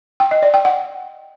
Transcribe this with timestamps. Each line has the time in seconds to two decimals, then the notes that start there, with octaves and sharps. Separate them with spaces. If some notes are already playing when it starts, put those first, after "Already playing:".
0.20 G5
0.31 D#5
0.43 D5
0.54 G5
0.65 F#5